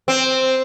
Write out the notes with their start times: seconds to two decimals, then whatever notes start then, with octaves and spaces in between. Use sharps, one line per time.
0.08 C4